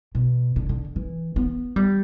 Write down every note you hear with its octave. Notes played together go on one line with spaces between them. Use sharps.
B2
D3
D3
E3
B3
G3